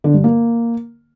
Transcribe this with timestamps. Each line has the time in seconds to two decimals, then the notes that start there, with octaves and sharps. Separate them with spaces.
0.04 D3
0.14 G2
0.24 A#3